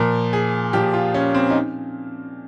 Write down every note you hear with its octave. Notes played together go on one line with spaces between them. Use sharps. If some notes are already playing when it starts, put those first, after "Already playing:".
Already playing: A#2 F3 A#4
G#4
A#2 F3 G4
F4
C#4
C4
D#4